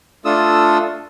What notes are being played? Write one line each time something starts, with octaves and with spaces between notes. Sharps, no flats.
A3 D4 F4 A4 D#6 E6